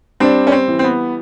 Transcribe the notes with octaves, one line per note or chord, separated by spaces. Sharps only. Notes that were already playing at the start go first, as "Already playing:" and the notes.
G3 C4 D4
C#4
C4
E3
C4
B3